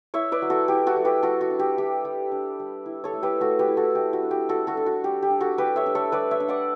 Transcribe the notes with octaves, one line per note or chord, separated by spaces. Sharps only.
E4 C#5 E5
B4 D5
F#3
F#4 A4
E4 G4
F#4 A4
G3
G4 B4
G3 F#4 A4
F#4
D4
G4
D4 G4
G3
D4
G3
E4
A4 C#5
A3
G4 B4
A3 F#4 A4
G4 B4
E4
F#4 A4
A3 G4
F#4
D4
G4
G3 F#4 A4
F#4 A4
D4
F#4
G3 G4
G4
D4
F#4 A4
G3 G4 B4
C#5 E5
D4
A4 C#5
G3 B4 D5
C#5 E5
D4
D5 F#5